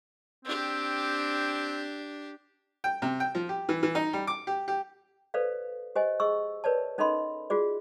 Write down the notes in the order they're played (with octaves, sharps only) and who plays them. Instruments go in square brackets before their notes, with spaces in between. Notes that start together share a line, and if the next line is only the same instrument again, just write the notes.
[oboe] C4 [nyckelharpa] D4 G4
[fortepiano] G5
C3
G5
F3
G4
E3
E3
D#4
G3
D6
G4
G4
[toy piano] A4 B4 C5 D5 F5
G4 C5 D#5 G#5
G#4 D#5 C#6 E6
A#4 B4 C#5 D5 A5
C#4 D#4 A4 D#5 B5 C6
F4 F#4 G#4 D5